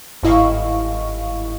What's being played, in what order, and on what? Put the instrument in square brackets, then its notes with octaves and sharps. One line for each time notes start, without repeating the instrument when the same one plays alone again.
[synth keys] G1 G#2 E4 D#5 F5 C#6